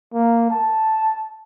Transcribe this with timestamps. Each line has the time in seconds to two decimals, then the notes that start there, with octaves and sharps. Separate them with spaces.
0.13 A#3
0.51 A5